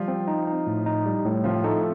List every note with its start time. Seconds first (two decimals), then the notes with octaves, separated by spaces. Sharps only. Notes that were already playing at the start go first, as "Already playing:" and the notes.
Already playing: F3 G3 F4
0.08 C4
0.28 D#4
0.47 D#4
0.67 A2
0.86 D#4
1.06 G3
1.25 A2
1.44 F3 C4 F4
1.64 A3 D#4 A4